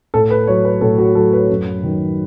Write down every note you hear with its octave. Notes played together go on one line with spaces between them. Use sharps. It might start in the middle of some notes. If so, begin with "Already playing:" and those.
A2 A4
B4
F#3 C#5
B4
A2 A4
F#4
F#3 A4
B4
F#2
D#3 F#3